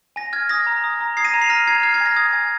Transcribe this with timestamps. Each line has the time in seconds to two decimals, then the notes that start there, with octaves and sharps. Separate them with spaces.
0.16 G#5 A#6
0.33 F6 G#6
0.49 D#6 A#6
0.67 A#5
0.84 D#6
1.01 A#5
1.17 D#6 G#6 C7
1.25 A#6 D#7
1.34 A#5
1.41 C7 F7
1.50 F6 A#6 D#7
1.67 A#5 G#6 C7
1.83 F6 G#6 C7
1.94 G#6 C7
2.01 G#5 A#6
2.16 D#6 G#6
2.33 G#5